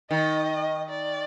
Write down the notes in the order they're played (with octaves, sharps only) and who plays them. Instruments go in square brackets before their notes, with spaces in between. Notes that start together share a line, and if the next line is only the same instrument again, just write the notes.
[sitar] D#3 [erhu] D#5
[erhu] D5